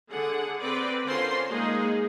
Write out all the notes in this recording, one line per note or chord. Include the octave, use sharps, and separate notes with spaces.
D3 G#4 F#5
C4 B4 D5
D3 C#4 F4 A#4 C5 C6
G#3 A#3 D#4 G#4